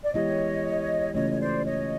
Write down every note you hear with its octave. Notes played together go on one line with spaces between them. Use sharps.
D5
E3 G#3 B3 E4 G4 C#5 D#5
C#3 E3 A3 C#4 F4 C#5 D#5
C#5
C5 D5
C#5 D#5